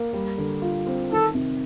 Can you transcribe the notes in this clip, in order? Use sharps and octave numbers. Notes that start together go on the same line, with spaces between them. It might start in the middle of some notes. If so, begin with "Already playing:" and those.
Already playing: A#3
G3
D3
F4
C4
D#3 A4
C3